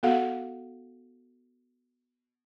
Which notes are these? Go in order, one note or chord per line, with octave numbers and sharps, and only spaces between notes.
B3 F#4 A4 F5 F#5